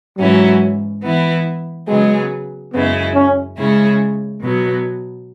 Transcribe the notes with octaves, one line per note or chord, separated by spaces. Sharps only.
G#2 E3 F#3 C#4 E4
E3 B3 E4
C#3 F#3 G#3 B3 G#4
F#2 C#3 G#3 B3 E4
C#4
C#3 G#3 C#4 E4 G#4
B2 F#3 B3